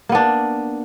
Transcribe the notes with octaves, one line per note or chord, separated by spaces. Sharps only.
A#3 B3 D4